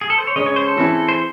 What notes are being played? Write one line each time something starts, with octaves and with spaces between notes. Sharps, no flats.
G#4
A4
C5
C#5
C#3 G#3 C#4 D#5
C#5
C5
A4
E3 C4 E4 G#4
C5